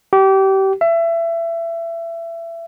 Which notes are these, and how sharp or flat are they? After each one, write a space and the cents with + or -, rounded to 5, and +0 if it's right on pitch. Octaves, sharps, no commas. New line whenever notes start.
G4 -25
E5 +25